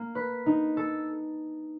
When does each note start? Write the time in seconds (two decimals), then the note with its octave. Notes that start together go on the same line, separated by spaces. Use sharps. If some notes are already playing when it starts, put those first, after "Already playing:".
Already playing: A#3
0.15 B4
0.46 D#4
0.77 A4